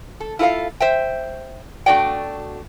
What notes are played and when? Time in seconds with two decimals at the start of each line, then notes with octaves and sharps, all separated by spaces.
0.20 A4
0.39 E4 F4 A4 B4 F5
0.80 C5 E5 G5
1.86 B2 A3 D4 F#4 D5 G5